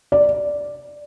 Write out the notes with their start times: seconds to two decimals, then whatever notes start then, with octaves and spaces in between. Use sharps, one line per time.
0.12 D5